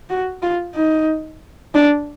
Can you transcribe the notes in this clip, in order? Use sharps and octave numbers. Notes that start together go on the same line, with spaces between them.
F#4
F4
D#4
D4